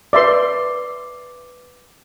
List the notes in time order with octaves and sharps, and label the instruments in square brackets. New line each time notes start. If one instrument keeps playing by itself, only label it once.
[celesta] B4 D6 [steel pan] D5 E5 C6